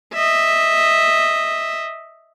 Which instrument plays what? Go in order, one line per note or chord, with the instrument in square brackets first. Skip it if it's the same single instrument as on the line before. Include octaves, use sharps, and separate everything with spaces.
[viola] D#5 E5